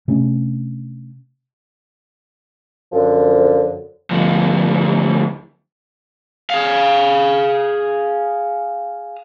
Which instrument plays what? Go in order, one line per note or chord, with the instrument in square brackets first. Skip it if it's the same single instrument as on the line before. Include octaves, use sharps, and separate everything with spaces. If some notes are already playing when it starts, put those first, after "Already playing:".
[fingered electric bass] C3 A3 C#4 D4
[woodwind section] F#2 D3 F3
[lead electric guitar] D2 F3
[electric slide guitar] G#4 F5